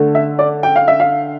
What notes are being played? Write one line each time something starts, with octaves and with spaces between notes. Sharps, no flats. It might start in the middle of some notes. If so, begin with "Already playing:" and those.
Already playing: D3 A3
E5
D5
G5
F5
E5
F5